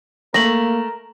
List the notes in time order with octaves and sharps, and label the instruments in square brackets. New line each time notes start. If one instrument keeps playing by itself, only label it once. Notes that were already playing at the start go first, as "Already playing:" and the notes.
[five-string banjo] A3 [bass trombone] A#3 [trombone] A#4 [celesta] A#6 F#7